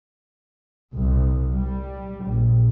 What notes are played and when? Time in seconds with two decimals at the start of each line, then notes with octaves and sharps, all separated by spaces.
0.94 C2
1.55 G3
2.27 A#1